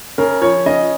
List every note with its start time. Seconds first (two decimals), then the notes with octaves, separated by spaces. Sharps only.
0.18 C#3 A#4
0.41 F3 C#5
0.66 C#3 D#5